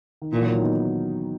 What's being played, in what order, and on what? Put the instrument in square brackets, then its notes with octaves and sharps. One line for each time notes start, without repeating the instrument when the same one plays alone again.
[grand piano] D#3
[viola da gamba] A#2 [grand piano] E3
[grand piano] D#3 F#3
D#3 F#3
B3 D#4